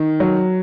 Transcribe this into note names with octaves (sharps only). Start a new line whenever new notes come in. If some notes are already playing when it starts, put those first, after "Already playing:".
Already playing: D#3
F#3